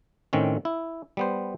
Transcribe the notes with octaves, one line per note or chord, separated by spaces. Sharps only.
A2 D#3 C4 C#4
E4
G3 B3 C5